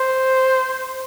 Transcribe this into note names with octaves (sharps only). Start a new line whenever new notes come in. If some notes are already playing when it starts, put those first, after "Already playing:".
Already playing: C5